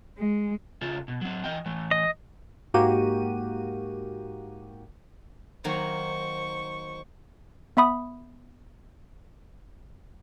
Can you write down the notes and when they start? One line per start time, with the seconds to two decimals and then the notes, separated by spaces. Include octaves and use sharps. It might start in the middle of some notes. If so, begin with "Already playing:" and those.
0.18 G#3
0.81 C#3 F4 A4
1.08 B2
1.21 F#3 C4
1.44 E3 D#5 G5
1.66 E3 A3
1.91 D#5
2.74 G#2 A#3 F#4 G4 D#7
5.64 D#3 F#3 A#3 C5 C#6
7.77 B3 E5 B5 D#6